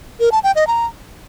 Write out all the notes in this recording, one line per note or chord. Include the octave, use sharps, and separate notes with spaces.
A#4
A5
G5
D#5
A#5